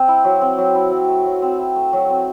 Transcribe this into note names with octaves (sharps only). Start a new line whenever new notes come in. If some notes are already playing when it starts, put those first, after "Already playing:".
Already playing: C4
E4
F#3
C4
F#3
E4
F#3
A3
F#3
C4
E4
A3
F#3
C4